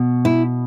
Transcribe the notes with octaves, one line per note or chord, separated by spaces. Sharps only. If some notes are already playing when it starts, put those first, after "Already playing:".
Already playing: B2
E4